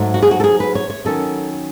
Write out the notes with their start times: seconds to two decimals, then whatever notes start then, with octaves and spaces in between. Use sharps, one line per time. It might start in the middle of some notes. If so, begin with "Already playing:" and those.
Already playing: G#2 F#3 A3
0.14 F#4
0.23 G#4
0.31 F#4
0.40 A4
0.44 G#4
0.60 B4
0.75 C#5
0.90 C#5
1.05 D#3 F#3 C#4 A4